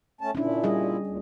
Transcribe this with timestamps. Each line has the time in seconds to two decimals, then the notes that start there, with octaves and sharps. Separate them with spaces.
0.21 A3 C#4 A5
0.35 A#2 C#4 D4 E4
0.64 G3 G#4 D#5
1.07 D2 A#2